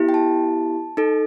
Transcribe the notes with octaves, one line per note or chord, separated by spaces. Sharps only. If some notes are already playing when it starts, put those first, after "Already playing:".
Already playing: B3 E4 G4
G5
A5
D#4 A4